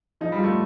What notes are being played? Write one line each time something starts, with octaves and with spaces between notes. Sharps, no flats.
F3 D#4
G3
F4
A3